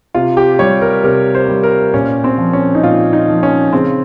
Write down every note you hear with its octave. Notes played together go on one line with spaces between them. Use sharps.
C3 F4
G4
G3 C#5
A#4
C3 A#4
C5
G3
A#4
A#2 C#4
C4
F3
C#4
D#4
A#2 F4
D#4
F3
C#4
C#3 C4